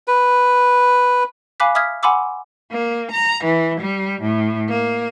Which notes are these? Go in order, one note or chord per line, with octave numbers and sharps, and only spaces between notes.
B4
F5 G#5 B5 D6 F#6 B6
E5 D#6 F6 G#6 B6
F#5 G#5 B5 C6 D6 E6
A#3
A#5
E3
G3
A2
A#3